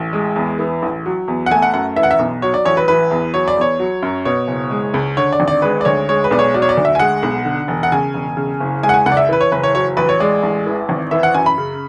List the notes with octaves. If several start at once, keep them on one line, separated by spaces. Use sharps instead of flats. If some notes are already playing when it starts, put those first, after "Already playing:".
Already playing: A1
G#3
E2
E3
A1
F#3
E2
F#5
A3 G#5
F#5
F#2 F#5
E3 E5
F#5
E5
B1
F#3 C#5
D5
A1 C#5
B4
E3 B4
E2
F#3 C#5
D5
E2 C#5
F#3
F#2
B2 C#5
F#1
G#3
C#2
D3 C#5
D5
G#1
D5
G#3 B4
D5
D2 C#5
G#3 C#5
B4
B1 D5
C#5
F#3 D5
C#5
D5
D2
E5
G#5
G#3 F#5
B1
D3
E1
F#5
C#3 G#5
E1
C#3
F#1
G#3 G#5
F#5
G#5
C#2 F#5
D5
E5
E3 B4
C#5
F#1 B4
C#5
F#3 C#5
A1 B4
C#5
G#3 D5
A1
E3
G#1
E3 E5
F#5
F#2 G#5
B5
C#3